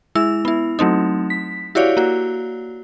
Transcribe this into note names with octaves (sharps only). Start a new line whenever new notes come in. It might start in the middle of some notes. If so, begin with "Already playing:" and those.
G#3 E4 E6
B3 E4
F#3 A3 C4 D#4
B6
E4 F#4 G4 C#5 D5 F5
A#3 F#4